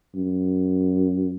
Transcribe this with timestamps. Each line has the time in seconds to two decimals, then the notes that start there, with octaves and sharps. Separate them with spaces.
0.15 F#2